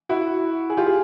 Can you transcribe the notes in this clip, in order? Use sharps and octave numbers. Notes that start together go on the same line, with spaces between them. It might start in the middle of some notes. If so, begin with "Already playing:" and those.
E4 F#4
G#4
F4 G4
G#4